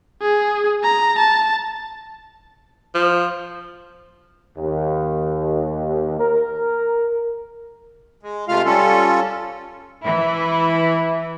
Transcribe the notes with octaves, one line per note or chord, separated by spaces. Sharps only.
G#4
A#5
A5
F3
D#2
A#4
G#3
C3 G#3 A3 F4 F5 F6
G3 C#4 F4 A4
E3 E4